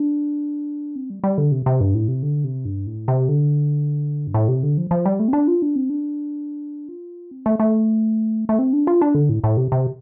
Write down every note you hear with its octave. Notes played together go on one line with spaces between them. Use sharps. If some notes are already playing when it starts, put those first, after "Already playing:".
Already playing: D4
C4
G3
G3
D3
C3
C3
G2
A2
C3
D3
C3
G2
A2
C3
D3
G2
A2
C3
D3
F3
F3
G3
A3
C4
D4
F4
D4
C4
D4
F4
C4
A3
A3
A3
C4
D4
F4
D4
D3
A2
A2
C3
C3